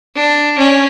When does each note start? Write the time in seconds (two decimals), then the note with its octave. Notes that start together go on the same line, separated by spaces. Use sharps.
0.16 D4
0.58 C#4